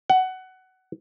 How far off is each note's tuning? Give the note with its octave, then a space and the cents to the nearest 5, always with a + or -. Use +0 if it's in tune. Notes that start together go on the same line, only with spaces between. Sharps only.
F#5 +15